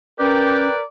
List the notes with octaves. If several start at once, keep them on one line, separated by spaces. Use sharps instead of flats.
C#4 G4 A#4 B4 D5 G5